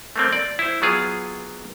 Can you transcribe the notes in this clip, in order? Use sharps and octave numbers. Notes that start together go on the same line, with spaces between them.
A3 A#3 C4
D5
E4 C5
F#3 B3 F4 G#4